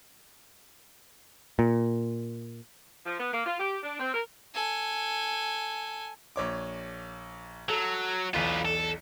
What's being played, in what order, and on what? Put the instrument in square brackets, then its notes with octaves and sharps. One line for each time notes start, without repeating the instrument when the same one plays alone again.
[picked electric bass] A#2
[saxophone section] F3
B3
A#3
F4
G4
D4
C4
A#4
[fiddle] A4 G#5
[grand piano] A#1 C#5 D6
[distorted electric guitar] F#3 [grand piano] A4
[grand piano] B1 E2 [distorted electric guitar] F4 B4
[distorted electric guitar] A4